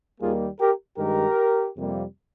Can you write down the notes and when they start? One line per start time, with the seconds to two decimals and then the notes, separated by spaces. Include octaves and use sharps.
0.20 D#2 D#3 G3 A#3 F4 G#4
0.60 G4 A#4
0.98 G2 D#3 G#3 G4 A#4
1.77 F2 C3 G3 A#3